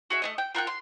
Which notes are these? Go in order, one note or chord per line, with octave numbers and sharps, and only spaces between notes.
F#4 G#4 E5
A3 C4 D#5
G5
F4 A#4 F#5 G5
C6